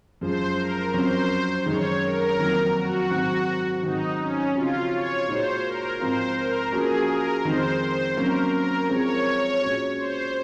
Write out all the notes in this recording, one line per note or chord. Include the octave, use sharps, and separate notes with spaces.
F#2 F3 G#3 C5
A#4
F2 C3 F#3 C#4 C5
F#2 D#3 G#3 D#4 C#5
A#4
F2 D#3 F#3 A#3
F#4
G#2 D#3 F#3 C4
G#2 D#3 F#3 C4 D#4
C#4
C#3 F3 C4 F4 F#4
C#5
A#2 G#3 D#4 F#4 C5
A#4
G#2 F3 C4 F4 C5
A#4
F3 A#3 C#4 F#4 G#4
A#4
F2 D#3 G#3 D#4 C5
C5
C3 F#3 A#3 C#4 A#4
A#4
C3 F3 G#3 C4 C#5
A#2 G#3 C#4 F#4
C5